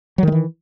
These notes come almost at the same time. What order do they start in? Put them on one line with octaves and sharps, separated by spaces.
F#3 D#3 G#3 E3